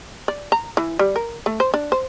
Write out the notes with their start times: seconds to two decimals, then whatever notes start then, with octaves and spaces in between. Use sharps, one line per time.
0.28 D5
0.52 A#5
0.77 E3
0.99 G3
1.16 A#4
1.46 A3
1.60 C5
1.74 D4
1.92 C5